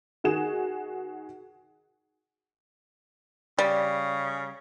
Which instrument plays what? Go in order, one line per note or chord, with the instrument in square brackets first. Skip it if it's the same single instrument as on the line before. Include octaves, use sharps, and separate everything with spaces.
[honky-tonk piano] D#3 F#4 G#4 E7
[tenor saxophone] C#3 [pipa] G3